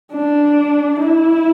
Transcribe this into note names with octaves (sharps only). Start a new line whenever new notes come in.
D4
E4